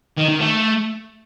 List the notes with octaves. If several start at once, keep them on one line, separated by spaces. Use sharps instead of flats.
D#3
D#3
A3